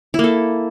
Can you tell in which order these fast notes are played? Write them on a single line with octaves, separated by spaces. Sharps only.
E4 A#3 A4